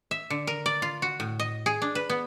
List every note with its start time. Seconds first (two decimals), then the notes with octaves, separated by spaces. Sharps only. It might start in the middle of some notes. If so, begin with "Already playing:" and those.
0.11 E5
0.30 D3
0.47 A#4
0.66 D5
0.82 F4
1.02 F#4
1.20 A2
1.40 D#5
1.66 G#4
1.82 D4
1.95 B4
2.10 B3